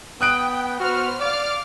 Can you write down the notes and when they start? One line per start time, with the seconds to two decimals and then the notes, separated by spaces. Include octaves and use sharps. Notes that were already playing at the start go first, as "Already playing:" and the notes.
0.21 B3 G5 D#6 F#6 D7
0.80 B3 F#4 C5 F6
1.21 D5 F5 D6 F6